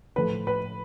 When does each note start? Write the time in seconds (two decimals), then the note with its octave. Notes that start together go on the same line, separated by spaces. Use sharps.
0.16 A2 F3 A3 B4
0.47 B4